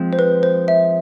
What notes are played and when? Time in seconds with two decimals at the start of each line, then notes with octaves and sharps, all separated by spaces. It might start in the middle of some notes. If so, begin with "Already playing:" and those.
Already playing: F3 G#3 C4
0.13 C5
0.19 B4
0.43 C5
0.68 E5